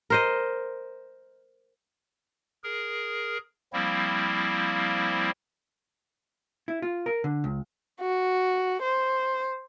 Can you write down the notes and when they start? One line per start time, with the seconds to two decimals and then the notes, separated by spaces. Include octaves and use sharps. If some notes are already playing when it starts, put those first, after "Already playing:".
0.10 A#4 C5 D#5
2.64 G#4 A#4
3.73 F3 G3 A#3 C4 E4
6.68 E4
6.82 F4
7.06 A#4
7.24 D3
7.44 C#2
8.01 F#4
8.82 C5